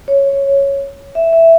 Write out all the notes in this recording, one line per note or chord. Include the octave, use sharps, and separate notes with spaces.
C#5
E5
E5